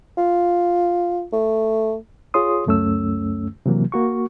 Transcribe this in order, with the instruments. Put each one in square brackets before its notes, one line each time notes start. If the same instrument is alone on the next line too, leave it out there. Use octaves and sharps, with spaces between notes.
[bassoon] F4
A3
[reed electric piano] F4 G#4 C#5 C6 D#6
C#2 F#2 A3 C#4 E6
C3 E3 F#3 A#3
A#3 F#4 C#6